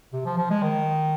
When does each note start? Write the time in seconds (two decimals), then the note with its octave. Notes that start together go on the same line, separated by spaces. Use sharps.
0.13 C3
0.25 F3
0.38 F3
0.50 G#3
0.62 D#3